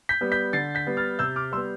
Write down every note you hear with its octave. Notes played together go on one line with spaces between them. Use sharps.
G6 B6
G3 B3
G6 B6
D3 A6 C7
G6 B6
G3 B3
F6 A6
C3 E6 G6
D6 F6
G3 B3 C6 E6